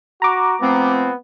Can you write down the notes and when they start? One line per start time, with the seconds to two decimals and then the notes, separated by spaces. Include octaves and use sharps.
0.22 F#4 A#5 D6
0.61 F3 A3 B3 C4